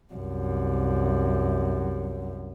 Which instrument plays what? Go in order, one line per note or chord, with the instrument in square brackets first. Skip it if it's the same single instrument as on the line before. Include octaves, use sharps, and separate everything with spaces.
[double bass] C2 F#2